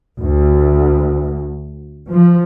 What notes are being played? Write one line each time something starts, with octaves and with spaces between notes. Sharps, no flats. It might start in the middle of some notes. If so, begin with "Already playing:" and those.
D2
F3